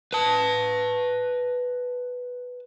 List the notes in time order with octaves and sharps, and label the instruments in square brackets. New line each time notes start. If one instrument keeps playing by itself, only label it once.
[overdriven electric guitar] B4 A5